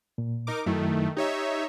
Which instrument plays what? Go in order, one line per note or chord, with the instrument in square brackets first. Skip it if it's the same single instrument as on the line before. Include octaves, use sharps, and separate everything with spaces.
[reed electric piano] A#2
[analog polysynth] D#4 A#4 D6
[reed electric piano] F#2 F#3 E4 [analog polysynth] D#3 A3
[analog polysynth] D#4 C#5 E5 [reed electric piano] G4